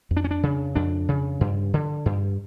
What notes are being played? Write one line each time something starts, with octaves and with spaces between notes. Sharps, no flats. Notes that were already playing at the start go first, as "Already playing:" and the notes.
F2
D4
C#4
D4
C#3
F2 D4
C#3
G2
D3
G2